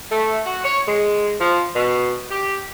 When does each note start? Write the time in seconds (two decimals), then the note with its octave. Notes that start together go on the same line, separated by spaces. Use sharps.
0.11 A3
0.46 F#4
0.63 C#5
0.87 G#3
1.40 F3
1.75 B2
2.31 G4